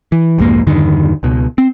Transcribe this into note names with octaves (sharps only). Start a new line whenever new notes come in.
E3
C2 F2 G#2 A#3
E2 G2 D3 D#3
C#2 B2
C4